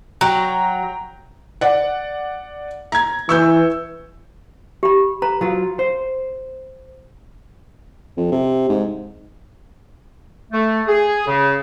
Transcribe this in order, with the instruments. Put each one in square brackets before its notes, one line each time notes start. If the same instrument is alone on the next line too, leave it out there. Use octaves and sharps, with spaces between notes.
[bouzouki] F#3 [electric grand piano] G5 A#5
[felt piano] D5 F#5
A#5 G#6
[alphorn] E3 [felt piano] C#6 E6 G6
[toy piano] G4 B5
[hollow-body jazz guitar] B4 [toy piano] A#5
[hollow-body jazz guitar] F#3 F4
C5
[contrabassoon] F2
C3
G#2
[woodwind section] A3
G#4
C#3